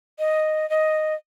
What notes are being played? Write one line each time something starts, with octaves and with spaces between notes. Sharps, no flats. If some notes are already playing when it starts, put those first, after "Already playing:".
D#5
D#5